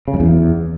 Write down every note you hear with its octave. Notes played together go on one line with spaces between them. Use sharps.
C#3
F#2
E2